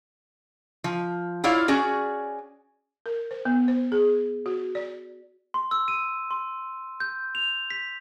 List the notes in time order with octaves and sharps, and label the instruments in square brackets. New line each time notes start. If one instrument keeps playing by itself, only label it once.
[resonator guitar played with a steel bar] F3
E4 F4 C#5 D5 F5
C#4 F#4 G#4 D5
[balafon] A#4
C5
B3
C5
G#4
F#4
D5
[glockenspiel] C6
E6
D#7
C6
G6
F7
B6